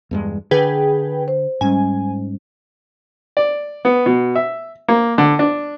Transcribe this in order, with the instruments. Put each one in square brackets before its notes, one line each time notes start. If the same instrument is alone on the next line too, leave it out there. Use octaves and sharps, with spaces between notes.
[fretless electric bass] E2 G2 G#3
[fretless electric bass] D3 [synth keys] G#4 B4 G5
[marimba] C5
[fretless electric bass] G#2 [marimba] G3 C#4 [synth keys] G#5
[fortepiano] D5
B3
B2
E5
A#3
D3
D4